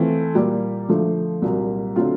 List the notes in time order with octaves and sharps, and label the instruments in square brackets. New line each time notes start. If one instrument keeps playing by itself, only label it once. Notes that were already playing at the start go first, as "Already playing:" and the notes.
Already playing: [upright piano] E3 A3 C4 F4 A4
A#2 G3 A#3
D3 F3 A3
C2 A#2 F#3 A#3
D3 F#3 A3 C4 F4